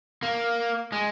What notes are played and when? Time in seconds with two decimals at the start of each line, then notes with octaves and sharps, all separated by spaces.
0.23 A#3
0.92 G#3